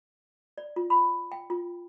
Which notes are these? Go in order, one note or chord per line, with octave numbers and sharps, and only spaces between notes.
D5
F4
B5
G5
F4